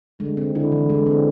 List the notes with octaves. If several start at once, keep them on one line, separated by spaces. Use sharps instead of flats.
D3 G#3
C4
D3 E4
E3
G#3
C4